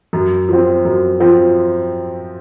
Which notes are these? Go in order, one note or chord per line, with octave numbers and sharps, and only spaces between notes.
F#2
F3 C4
F#2
F3 C4